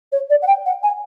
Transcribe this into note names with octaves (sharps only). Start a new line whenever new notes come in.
C#5
D5
F#5
G5
F#5
G#5